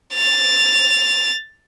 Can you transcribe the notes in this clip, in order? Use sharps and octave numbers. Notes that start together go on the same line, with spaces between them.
A6 F7